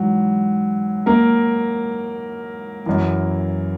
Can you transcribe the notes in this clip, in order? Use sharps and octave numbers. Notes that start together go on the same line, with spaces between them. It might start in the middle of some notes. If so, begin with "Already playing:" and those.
Already playing: G#2 E3 F#3
A#3 A#4
F#2 E3